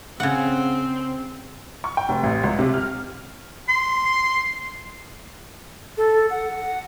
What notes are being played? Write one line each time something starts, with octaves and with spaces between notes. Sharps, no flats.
C#3 C4 F#5
C#6
G5
F1
A1
C#2
C3
F6
C6
A4
F#5